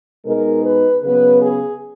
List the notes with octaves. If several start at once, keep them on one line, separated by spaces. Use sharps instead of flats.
B2 G#3 D#4 A#4
B4
C#3 F#3 B3 B4
G#4